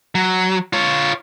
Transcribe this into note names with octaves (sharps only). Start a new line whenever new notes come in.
F#3
F4 C#5